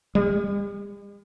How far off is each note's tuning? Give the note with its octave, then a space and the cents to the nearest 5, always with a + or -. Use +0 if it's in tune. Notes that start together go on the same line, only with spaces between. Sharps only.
G3 +45